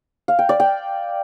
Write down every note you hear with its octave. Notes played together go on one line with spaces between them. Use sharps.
F5
G5
D5
G5